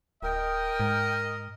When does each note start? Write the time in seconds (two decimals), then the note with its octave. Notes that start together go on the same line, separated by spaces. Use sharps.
0.23 D1 A#4 D#5 G5
0.80 G#2